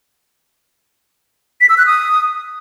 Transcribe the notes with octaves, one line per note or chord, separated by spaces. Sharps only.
B6
E6
F#6
D#6